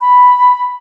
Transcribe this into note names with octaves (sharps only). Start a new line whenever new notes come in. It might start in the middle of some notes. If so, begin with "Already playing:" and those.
B5